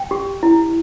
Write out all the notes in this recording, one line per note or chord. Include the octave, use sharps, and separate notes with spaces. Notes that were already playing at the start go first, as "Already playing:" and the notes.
Already playing: G5
G4
E4